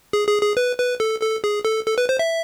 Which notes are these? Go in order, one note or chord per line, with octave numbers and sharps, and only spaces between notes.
G#4
G#4
G#4
B4
B4
A4
A4
G#4
A4
A4
B4
C5
E5